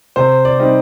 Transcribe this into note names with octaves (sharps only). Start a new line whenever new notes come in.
C3 C5
D5
G3 C4 D#4